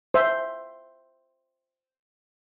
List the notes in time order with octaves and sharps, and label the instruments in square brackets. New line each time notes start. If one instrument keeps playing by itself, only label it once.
[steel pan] C5 E5